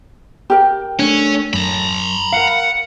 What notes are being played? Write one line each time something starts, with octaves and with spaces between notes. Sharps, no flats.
G4 A#4 G5
A3 C#4 D4
F#2 A#5 B5
A#4 F5 F#5